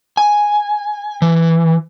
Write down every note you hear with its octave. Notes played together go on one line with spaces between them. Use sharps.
G#5
E3